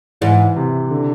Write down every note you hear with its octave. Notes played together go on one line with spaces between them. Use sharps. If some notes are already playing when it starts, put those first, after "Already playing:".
G#2 E3
C3
D3